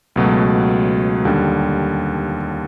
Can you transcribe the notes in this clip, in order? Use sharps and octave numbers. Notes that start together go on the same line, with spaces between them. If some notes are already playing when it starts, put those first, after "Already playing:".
C#2 B2 F#3 A3
D#2 D3 G3